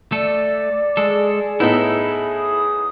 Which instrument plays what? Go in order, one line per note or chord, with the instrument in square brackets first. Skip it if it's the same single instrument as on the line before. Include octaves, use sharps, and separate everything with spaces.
[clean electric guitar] A3 A4 [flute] D5
[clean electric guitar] G#3 A4 [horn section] G#4
[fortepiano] A2 B3 D#4 [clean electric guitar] E4 A4
[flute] D#6